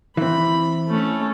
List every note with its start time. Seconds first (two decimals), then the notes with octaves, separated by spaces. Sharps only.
0.17 E3 C4 B5
0.88 A3 C#4